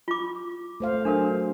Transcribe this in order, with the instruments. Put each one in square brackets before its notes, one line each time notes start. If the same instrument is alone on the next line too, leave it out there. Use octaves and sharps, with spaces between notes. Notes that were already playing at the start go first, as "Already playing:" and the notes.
[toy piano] F4 D6
[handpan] A3 C5 F5
[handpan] F#3 [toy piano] D4 A4 A#4